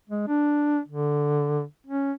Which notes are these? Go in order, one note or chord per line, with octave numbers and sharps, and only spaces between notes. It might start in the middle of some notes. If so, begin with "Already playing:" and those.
G#3
D4
D3
C#4